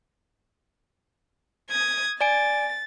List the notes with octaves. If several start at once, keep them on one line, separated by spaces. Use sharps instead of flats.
D#6 G#6
D5 G#5 A6 D7